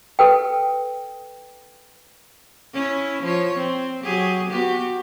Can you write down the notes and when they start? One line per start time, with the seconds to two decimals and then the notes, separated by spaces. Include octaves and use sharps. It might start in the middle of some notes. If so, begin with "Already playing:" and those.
0.19 A4 B4 G5
2.73 C#4 E4
3.23 F3 C#5
3.57 C4
4.04 F#3 G4 G#4
4.49 B3 F#4 G4